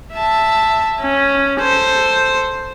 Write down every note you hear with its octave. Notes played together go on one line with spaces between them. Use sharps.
E5 A5
C#4
A4 C5